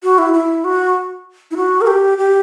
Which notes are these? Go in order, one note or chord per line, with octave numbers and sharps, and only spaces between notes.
F#4
E4
E4
F#4
E4
F#4
A#4
G4
G4